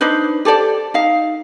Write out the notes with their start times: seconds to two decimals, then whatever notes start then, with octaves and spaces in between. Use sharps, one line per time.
0.01 D4 D#4 B4 C5
0.45 G4 A4 C5 D5
0.94 D#4 F5